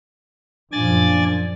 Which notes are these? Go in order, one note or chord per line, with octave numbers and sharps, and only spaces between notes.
F#2 A#2 F3 D4 D5 G#5 A6